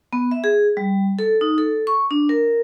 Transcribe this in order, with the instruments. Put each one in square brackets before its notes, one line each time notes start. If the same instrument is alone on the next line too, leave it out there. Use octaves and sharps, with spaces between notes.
[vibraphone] B3
E5
G#4
G3
A4
D#4
A4
C#6
D4
A#4